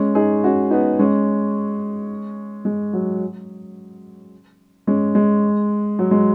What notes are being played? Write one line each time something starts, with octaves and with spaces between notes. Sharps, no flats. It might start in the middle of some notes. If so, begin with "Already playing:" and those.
Already playing: G#3 C#4
D#4 G#4
C#4 F#4
B3 D#4
G#3 C#4
G#3
F#3
G#3 C#4
G#3
F#3
G#3